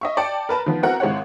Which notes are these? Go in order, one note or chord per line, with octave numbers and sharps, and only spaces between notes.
D#5 E5 C#6
D5 G5 A5 C#7
A#4 B4 A5 B5
D#3 F3 B3
B3 C4 E4 F#4 A#4 F#5
G#1 G#3 E4 C5 C#5 F#5